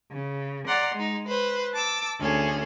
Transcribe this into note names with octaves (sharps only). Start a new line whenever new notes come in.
C#3
D5 F#5 A#5 C6
G#3 D#4
B4 C5
A5 D6 E6
D2 C#4 G#4 A4